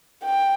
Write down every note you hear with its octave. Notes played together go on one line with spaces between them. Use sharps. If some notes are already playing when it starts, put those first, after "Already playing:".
G5